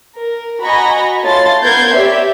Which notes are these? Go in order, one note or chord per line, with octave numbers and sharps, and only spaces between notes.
A#4
F#4 D#5 G#5 A#5 B5 C#6
A3 F4 C#5 A5 C6 A6
B3 A#4 G6 G#6 C7
G4 C#5 D5 E5